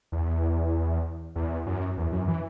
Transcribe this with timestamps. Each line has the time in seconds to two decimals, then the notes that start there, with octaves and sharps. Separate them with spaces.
0.12 E2
1.36 E2
1.66 F#2
1.97 E2
2.12 F#2
2.28 E3